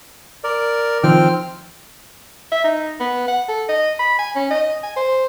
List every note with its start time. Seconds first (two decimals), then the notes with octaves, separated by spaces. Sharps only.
0.44 A#4 D5
1.03 D#3 F3 C4 G5 F6
2.52 E5
2.64 D#4
3.00 B3
3.28 F#5
3.48 A4
3.69 D#5
3.99 B5
4.18 G#5
4.35 C#4
4.50 D#5
4.83 G#5
4.96 C5